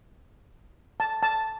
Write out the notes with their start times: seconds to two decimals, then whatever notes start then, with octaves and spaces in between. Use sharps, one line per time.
1.00 A5
1.23 A5